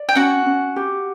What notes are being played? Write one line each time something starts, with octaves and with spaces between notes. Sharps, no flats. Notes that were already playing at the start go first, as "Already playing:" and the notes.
Already playing: D5
G5
C#4 F#4 F#5
C#4
G4